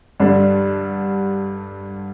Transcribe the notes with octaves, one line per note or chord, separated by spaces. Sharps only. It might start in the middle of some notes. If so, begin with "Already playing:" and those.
G2 D3 G3 D4